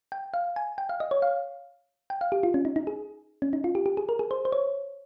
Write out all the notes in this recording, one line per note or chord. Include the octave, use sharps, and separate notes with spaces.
G5
F5
G#5
G5
F5
D#5
C#5
F5
G5
F5
G4
F4
C#4
D#4
D#4
G#4
C#4
D#4
F4
G4
G4
G#4
A#4
G#4
C5
C5
C#5